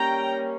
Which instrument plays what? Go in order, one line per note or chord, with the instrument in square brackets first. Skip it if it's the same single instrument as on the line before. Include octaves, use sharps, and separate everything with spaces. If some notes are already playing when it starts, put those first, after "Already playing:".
Already playing: [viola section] G3 A#3 C#4 G5 A#5